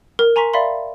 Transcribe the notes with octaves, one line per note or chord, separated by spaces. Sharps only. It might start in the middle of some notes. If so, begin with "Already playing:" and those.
A#4
G#5 A#5 C6 C#6 B6
D5 E5 F5 B5 C6